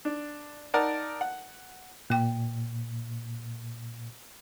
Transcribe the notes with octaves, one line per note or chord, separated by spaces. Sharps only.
D4
D#4 A#4 D5 F#5 A5
F#5
A#2 A#3 G5